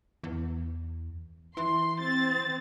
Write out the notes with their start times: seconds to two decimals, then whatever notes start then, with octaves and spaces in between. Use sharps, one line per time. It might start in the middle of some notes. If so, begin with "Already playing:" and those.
0.24 E2
1.57 E3 C6
2.00 C4 A6